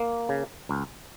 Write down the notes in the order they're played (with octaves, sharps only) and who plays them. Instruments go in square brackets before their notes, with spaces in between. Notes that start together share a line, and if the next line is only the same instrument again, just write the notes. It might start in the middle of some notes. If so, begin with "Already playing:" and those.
Already playing: [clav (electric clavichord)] A#3
C#3
C#2